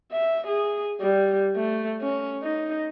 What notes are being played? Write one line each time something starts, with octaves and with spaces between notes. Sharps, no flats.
E5
G#4
G3
A3
C#4
D#4